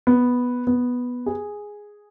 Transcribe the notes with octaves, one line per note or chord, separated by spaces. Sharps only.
B3
B3
G#4